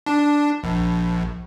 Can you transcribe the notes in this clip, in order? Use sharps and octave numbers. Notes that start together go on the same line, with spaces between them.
D4
A#1